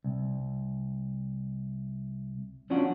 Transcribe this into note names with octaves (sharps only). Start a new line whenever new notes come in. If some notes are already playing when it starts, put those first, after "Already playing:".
C2
F3 C#4 D4 F4 F#4